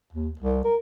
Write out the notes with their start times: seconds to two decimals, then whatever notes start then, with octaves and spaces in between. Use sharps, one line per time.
0.13 D#2
0.39 C2
0.64 A#4